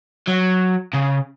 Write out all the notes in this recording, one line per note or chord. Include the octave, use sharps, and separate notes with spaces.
F#3
C#3